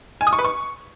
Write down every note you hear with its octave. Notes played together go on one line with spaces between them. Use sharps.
G#5
D#6
C#6
B4
C#6